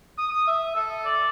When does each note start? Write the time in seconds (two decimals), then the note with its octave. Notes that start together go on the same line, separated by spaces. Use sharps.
0.18 D#6
0.31 D#6
0.47 E5
0.76 A4
1.05 D5